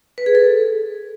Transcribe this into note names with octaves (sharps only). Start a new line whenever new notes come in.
B4
G#4
A4